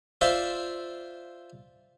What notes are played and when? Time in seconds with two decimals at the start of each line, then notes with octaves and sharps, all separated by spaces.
0.21 F4 C5 D5 E5